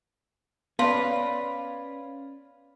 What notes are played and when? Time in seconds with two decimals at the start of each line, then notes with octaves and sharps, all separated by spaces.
0.79 B3 C#4 B4 D5 F5 C6